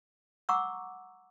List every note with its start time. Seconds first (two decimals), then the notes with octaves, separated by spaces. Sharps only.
0.49 F#5 A#5 C#6 D6 E6